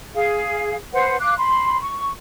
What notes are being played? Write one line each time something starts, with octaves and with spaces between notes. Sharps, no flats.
G#4 F5
B4 C5 F#5
F5 D6 F#6
B5 C6
C#6